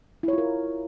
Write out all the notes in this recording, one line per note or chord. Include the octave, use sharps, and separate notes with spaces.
E4 F4 A#4 C#5